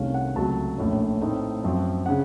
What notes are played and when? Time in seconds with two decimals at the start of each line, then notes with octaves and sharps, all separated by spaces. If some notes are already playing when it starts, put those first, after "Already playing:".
Already playing: C2 C3 D#3 A3 C#4 F5
0.14 F#5
0.35 C#2 C3 F#3 A3 A5
0.78 A#1 A2 A3 C#4
1.21 A2 A3 C4 D#4
1.63 F#2 F3 C4
2.06 C#3 F#5